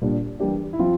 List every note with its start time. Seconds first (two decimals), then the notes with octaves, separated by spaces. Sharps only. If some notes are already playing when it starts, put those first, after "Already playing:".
0.02 A#2 G3 D4
0.40 E3 G3 A#3 D4 G4
0.73 E4
0.79 F3 C4 F4